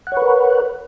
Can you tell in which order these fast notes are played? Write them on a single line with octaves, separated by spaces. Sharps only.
F#5 C#5 B4 A#4